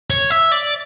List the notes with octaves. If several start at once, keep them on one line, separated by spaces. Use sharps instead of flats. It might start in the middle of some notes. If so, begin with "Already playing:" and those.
C#5
E5
D5